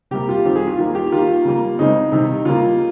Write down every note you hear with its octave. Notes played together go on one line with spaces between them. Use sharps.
C3 G3 A#3 G4
F4
D#3 G3 C4 G4
G#4
F4
D#3 G3 A#3 F4
G4
D#3 A#3 F4
C#3 G3 A#3
C#3 G#3 C4 D#4
C3 D#3 G3
C#3 G3 A#3 F4